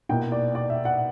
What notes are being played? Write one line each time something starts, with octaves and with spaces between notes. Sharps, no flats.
B2 A#3 E4 G5
D5
D5
E5
F#5